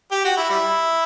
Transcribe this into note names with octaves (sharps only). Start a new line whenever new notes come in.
G4
F#4
E4
G3 E4